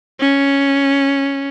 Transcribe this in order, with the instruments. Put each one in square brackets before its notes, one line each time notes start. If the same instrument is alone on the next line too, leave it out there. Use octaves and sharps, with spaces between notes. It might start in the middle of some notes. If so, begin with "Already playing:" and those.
[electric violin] C#4